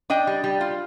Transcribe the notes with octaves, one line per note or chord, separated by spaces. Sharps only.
D4 D#5 G5
G3
G3
F4